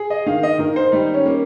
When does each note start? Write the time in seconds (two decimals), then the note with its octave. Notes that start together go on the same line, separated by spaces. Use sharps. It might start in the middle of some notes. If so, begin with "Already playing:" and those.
Already playing: G#4
0.10 D#5
0.26 D#3 F5
0.43 D#5
0.59 D#3 A#4
0.76 C5
0.92 G3 D#4
1.14 C#4
1.26 A#3